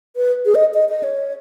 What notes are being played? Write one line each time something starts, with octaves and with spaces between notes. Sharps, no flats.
B4
G#4
D#5
D#5
D#5
C#5